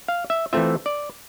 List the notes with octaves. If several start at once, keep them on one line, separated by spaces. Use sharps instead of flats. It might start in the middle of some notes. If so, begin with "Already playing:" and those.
F5
E5
E3 A3 C4 F4 E5
D5